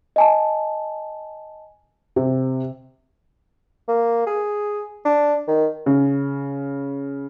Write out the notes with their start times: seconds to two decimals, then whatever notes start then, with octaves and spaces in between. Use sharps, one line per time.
0.16 D#5 G#5 A5
2.16 C3
3.88 A#3
4.27 G#4
5.05 D4
5.48 D#3
5.86 C#3